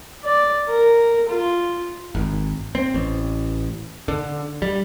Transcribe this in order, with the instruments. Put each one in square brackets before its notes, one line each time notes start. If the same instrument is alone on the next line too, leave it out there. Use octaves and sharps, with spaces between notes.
[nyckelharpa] D5
A#4
F4
[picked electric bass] G#1
C4
A1
D3
G3